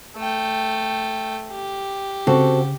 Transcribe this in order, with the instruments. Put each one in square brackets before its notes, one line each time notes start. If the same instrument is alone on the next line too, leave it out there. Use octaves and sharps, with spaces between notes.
[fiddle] A3 G5
G4
[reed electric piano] C#3 [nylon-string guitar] C4 F#4 A4